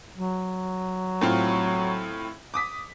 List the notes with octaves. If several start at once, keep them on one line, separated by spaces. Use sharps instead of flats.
F#3
A2 C4 F4
D6 D#6 B6